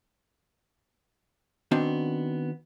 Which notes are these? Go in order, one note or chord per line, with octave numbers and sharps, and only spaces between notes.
D#3 B3 C4 D4 F#4